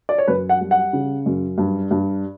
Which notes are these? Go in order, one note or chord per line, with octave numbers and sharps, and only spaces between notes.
D5
C#5
F#2 B4
F#5
G3
F#5
C#3
F#2
G2
G2